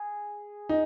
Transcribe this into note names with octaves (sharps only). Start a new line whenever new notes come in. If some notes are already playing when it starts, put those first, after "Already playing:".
Already playing: G#4
D#4